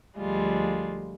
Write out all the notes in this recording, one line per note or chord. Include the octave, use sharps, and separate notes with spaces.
D2 F3 G3 G#3 F4